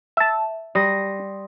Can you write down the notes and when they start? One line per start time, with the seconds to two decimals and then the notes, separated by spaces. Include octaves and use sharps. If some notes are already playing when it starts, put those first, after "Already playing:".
0.17 E5 A5
0.75 G3 C6 D#6 A#6